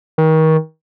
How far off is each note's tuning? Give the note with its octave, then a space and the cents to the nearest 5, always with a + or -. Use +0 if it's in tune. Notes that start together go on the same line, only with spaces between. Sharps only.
D#3 +30